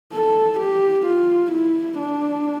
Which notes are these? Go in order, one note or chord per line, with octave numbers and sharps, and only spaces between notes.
A4
G4
F4
E4
D4